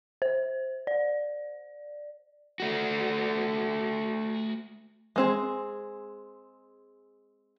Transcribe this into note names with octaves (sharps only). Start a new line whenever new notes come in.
C5
D5
A3 F#4
G#3 C4 G#4